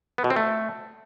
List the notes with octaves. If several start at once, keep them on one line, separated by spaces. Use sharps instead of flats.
B3
B2
C4
A3